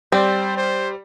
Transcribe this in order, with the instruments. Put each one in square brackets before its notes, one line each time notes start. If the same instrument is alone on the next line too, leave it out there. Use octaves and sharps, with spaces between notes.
[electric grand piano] G3 D5 [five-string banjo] C4 [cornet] C5
[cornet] C5